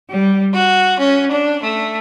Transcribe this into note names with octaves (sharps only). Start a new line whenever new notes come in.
G3
F#4
C#4
D4
A3